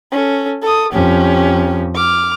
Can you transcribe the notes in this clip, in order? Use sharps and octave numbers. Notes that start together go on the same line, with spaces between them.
C#4 A4
A4 D#6
F2 C#4 G4
D6 F6